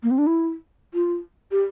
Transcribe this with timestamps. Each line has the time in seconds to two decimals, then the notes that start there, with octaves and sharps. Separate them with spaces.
0.03 A#3
0.11 C4
0.18 D4
0.27 E4
0.94 F4
1.51 G4